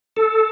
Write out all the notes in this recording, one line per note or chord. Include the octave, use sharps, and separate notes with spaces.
A4